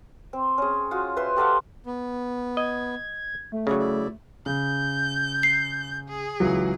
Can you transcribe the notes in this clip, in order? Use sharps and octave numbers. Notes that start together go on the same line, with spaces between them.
C4
C#4 G#4
F4 F#4 G#4
B4 C5 E5 C6
G4 A4 F5 F#5
B3
D#5 G#6
A3
C#3 F#3 C#5 D5
E4 D5
C#3 G6
C7
G#4
C#2 E3 F#3